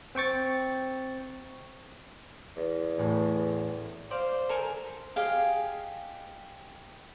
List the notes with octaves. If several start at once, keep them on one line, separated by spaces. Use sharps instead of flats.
C4 G5 C#6 A6
E2
A1 A2
C5 D5 F5
A4 A#4 G#5
G4 G#4 D#5 F5